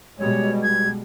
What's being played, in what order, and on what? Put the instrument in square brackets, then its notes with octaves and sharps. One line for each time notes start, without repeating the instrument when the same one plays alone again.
[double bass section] B2 G3 G#3 [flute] C#5
[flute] G#6